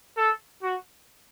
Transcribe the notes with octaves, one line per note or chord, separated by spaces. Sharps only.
A4
F#4